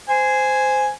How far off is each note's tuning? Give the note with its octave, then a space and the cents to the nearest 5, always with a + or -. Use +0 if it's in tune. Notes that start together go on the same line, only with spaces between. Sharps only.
C5 -15 G#5 +0